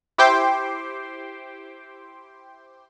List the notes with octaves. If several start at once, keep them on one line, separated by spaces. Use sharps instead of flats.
E4 G4 C5 G5 C6 D6